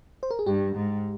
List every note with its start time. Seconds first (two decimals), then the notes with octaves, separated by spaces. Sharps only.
0.23 C5
0.31 A#4
0.39 G#4
0.46 G2 G4
0.76 G#2